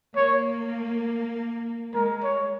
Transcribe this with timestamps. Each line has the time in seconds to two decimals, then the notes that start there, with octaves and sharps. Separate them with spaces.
0.16 A#3 C#5
1.94 G#3 A#4
2.23 C#5